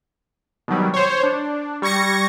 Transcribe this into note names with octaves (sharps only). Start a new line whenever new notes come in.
B2 D#3 F#3 G3
C5 C#5
D4
G3 C#6 G#6 A#6 C#7